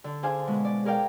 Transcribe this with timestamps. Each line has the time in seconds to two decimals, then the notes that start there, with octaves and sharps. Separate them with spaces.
0.04 D3
0.23 D4 G#4 C5 F5 G#5
0.47 B2 G#3
0.65 D5
0.85 G#4 A#4 D5 F5 G5